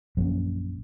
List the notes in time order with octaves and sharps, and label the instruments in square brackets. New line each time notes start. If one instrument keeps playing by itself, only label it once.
[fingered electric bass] A#1 F#2